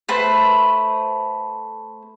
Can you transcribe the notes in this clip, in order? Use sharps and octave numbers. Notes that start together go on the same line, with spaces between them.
A3 B4 C5